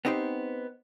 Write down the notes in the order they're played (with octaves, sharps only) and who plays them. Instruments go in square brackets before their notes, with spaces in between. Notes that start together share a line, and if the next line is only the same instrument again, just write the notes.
[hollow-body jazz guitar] B3 C4 D#4 G4 C5